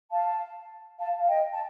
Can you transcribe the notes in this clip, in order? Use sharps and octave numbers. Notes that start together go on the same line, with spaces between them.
F5 A5
F5 A5
F5
D#5 G5
A5